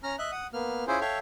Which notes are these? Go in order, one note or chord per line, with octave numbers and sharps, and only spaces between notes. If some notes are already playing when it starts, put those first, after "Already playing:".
C#4 A#5 F6
D#5 E5 F#6
F#5 D#6
A#3 B3 F6
C#4 E4 F4 G#4 C5
A4 C#5 E5 F5 G5